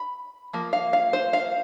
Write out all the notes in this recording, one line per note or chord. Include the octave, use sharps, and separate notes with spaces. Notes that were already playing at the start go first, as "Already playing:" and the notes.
Already playing: B5
F3 A#3
F5
F5
C5
F5